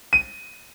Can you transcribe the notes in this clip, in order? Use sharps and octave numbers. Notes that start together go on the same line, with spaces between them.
D#7